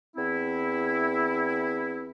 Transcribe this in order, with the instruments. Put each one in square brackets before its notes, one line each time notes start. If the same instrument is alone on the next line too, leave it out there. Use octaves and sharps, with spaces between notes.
[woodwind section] E2 C4 E4